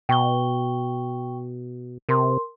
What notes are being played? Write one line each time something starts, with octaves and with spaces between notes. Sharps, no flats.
B2 G5 C#6 G7
C3 A#4 C6